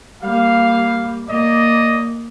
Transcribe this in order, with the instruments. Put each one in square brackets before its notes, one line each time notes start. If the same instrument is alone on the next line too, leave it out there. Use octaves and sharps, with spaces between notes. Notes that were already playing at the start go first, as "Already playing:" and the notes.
[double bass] G3 A#3 [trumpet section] F5
[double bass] A#3 [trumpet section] D5 D#5